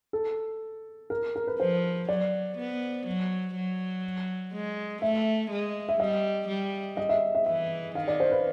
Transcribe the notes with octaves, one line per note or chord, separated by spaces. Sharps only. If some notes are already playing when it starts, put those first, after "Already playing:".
A4
A#4
A#4
B4
F3 C5
F#3 D5
B3
F#3
F#3
G#3
A3 E5
G#3
E5
G3 D#5
G3
D#5
E5
E5
E3 E5
D#3 F5
D5
C5
B4